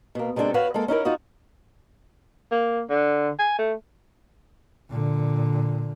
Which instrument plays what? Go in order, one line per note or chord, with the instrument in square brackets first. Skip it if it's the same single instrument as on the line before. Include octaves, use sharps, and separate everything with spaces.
[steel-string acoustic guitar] B2 A#3
C3 G#3 B3 D4 A4 C5
F#4 B4 C#5 F5 F#5
G#3 A#3 A4
C#4 D#4 E4 A#4
D#4 F4 F#4 D#5
[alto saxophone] A#3
D3
G#5
A3
[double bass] A#2 D3